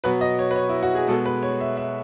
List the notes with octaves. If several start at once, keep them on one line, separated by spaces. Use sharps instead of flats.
B2 F#3 B3 B4
D#5
C#5
B4
C#5
E4
F#4
G#4
B2 G#3 B3 A4
B4
C#5
E5
E5